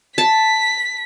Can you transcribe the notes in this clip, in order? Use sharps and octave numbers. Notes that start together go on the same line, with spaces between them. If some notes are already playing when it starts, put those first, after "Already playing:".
A5 B6